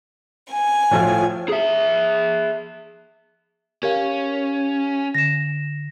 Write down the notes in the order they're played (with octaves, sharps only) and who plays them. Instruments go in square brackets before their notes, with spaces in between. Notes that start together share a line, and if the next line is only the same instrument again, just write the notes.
[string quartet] G#5
[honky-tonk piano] A2 F3 F4
[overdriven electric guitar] G#4 E5
[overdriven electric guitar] C#4 [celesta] G4 F5 [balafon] A#4
[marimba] D3 [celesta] A#6 E7